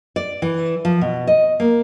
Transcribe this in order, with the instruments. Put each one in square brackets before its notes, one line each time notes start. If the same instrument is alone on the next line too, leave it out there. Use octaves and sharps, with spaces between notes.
[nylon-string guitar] D5
E3
F3
B2
D#5
A#3